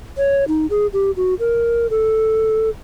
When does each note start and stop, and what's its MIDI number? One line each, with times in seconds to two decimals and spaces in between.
0.18 0.44 73
0.48 0.66 63
0.70 0.87 68
0.93 1.11 67
1.17 1.34 66
1.40 1.87 70
1.90 2.69 69